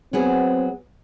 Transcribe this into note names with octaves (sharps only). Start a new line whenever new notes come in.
F#3 B3 C4 G#4